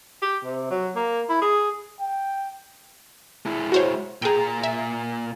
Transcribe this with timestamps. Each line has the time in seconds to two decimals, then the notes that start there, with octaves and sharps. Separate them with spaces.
0.22 G4
0.44 C3
0.71 F#3
0.95 A#3
1.29 E4
1.41 G#4
2.00 G5
3.46 G#3 E4
3.72 F#4 C5 C#5
4.22 A#2 G#4 G5 A#5
4.63 E5